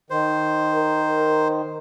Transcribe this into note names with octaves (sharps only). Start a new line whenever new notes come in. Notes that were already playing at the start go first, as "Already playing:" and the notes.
D#3 C5
A#4